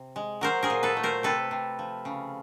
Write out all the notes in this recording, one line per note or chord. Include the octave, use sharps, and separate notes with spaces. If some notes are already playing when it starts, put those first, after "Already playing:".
Already playing: C3
G#3
F#3 A#4 C5
G#4 A#4
A#2
A4 B4
A3
A#4 C5
C3 A4 B4
C3
F3
C#3